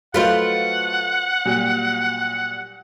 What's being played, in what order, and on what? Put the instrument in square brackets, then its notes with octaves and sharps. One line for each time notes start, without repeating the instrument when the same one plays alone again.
[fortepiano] F#3 A3 D#4 [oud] F4 B4 C5 [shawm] F#5
[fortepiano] A#2 F#3 G3